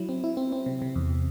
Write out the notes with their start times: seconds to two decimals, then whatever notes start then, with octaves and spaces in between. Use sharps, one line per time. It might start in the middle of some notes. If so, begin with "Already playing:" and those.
Already playing: F#3 E4
0.09 C4
0.24 E4
0.37 C4
0.52 C4
0.66 C3
0.82 C3
0.96 E2